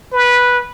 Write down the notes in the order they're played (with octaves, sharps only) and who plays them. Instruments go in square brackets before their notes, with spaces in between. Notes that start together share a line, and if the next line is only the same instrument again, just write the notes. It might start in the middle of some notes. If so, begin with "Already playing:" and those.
[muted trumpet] B4